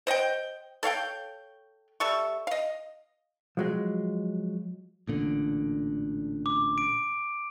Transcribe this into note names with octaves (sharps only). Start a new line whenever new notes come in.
C5 D#5 F#5 G5
A4 C#5 F5 G5
G3 A4 E5 C#6
D#5 F5
F3 F#3 G#3
A1 A#2 D3
D6
D7